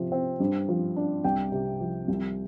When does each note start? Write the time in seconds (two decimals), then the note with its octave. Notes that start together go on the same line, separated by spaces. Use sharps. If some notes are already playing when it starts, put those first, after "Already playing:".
Already playing: C3 F3
0.12 C4
0.40 G2
0.69 F3
0.96 D4
1.24 C2 G5
1.52 C3
1.80 F3
2.08 C2